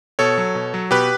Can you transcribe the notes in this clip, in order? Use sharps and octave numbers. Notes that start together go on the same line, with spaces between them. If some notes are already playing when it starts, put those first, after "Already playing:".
B2 A4 C#5
F#3
B2
F#3
B2 G4 B4